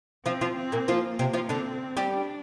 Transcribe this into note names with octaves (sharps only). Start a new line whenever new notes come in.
F3 C4 F4
F3 F4
C4
A#2 A#3
F3 A#3 F4
C3 C4
F3 F4
D3 C4 D4
G3 G4
D4